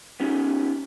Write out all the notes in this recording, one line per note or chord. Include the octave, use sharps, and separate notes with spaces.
B3 C#4 D#4 G4